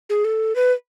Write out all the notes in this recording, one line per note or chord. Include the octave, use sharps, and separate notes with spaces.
G#4
A4
B4